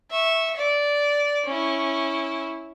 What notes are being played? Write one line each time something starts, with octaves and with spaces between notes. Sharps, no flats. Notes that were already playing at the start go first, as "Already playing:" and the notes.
E5 C#6
D5
C#4 E4